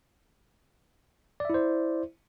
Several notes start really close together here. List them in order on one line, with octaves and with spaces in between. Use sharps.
D5 E5 E4 C5